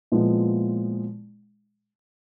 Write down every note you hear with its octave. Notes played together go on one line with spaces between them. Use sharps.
A#2 F3 G#3 B3 E4